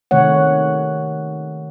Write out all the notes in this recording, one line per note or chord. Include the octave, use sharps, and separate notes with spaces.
C3 D#3 A3 C#5 F#5